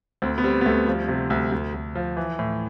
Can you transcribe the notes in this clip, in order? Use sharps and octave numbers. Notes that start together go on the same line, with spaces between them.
D2 C4
B3
G3 C4
B3
D2 A3
F3 G3
C3
D2
D2
D2
F3
E3
A2